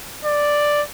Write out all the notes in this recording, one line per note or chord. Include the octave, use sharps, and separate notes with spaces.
D5